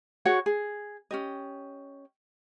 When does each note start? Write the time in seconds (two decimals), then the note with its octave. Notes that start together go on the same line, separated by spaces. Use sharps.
0.25 F#4 G#4 C#5 F#5
0.46 G#4
1.11 C#4 G4 D#5